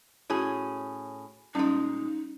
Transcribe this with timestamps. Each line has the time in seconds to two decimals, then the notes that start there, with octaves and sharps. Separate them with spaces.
0.30 A2 C#4 F#4 G#4
1.55 A#2 G3 G#3 C#4 D#4